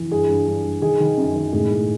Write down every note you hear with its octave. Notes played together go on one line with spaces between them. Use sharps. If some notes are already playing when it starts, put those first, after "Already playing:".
Already playing: E3
G2 G#4
G2
G2
G2
D#3 G#4
D#3
F#2
D#3
A2 G#4
A2